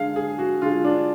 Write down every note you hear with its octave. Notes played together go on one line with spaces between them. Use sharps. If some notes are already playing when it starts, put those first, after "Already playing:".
Already playing: D3 G#3 F5
G#4
F#4
D3 G#3 F4
D4